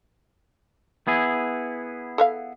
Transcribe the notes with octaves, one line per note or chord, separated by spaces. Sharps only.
B3 E4 G#4
A4 E5 F5